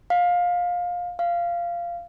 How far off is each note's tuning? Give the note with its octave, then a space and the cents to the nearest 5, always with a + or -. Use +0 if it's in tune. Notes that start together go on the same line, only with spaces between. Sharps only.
F5 +20
F5 -15